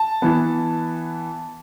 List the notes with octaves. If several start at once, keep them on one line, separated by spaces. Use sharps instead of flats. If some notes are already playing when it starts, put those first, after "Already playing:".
Already playing: A5
E3 B3